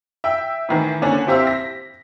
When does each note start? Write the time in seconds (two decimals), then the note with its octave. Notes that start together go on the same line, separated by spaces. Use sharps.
0.24 E5 G5
0.69 A2 D#3 E3
1.02 D3 A#3 C#4 D4
1.27 C4 E4 G4 C5 E5 F5
1.47 A#6 B6